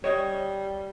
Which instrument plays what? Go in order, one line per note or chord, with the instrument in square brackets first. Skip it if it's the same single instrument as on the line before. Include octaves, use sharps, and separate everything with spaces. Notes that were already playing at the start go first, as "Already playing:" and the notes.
[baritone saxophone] G3 [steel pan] C#5 D#5